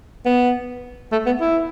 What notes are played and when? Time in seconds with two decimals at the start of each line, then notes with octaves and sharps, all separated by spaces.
0.26 B3
1.12 A3
1.26 B3
1.41 E4